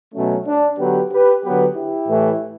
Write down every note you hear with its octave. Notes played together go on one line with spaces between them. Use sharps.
B2 F#3 A3 C#4
D4
D3 F#3 B3 G4 B4
G4 B4
D3 F#3 B3 G4 B4
E4 G4
A2 E3 A3